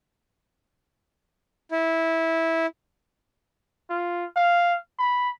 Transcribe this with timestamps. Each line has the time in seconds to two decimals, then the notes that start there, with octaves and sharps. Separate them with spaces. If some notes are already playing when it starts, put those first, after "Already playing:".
1.71 E4
3.90 F4
4.36 F5
4.99 B5